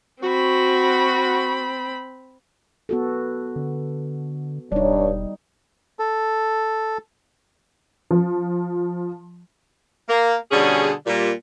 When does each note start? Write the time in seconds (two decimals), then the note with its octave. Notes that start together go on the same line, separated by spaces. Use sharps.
0.23 C4 F#4 B5
2.89 B3 F#4 A4
3.56 D3
4.72 E1 G2 G3 D4 D#4 C#5
5.99 A4
8.11 F3
10.08 A#3
10.51 B2 D3 G3 C#4 G#4
11.06 A#2 G3